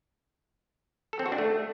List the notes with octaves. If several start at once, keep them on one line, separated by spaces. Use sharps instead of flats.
A4
C4
F#4
D4
A3